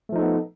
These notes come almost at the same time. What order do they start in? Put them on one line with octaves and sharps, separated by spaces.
A3 F3 D#4 A4 B3